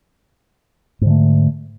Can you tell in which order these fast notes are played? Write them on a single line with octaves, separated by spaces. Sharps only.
G#2 D3 A3